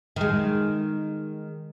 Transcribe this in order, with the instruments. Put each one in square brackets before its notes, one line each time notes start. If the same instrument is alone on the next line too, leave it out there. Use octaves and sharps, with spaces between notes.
[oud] D#3 G#3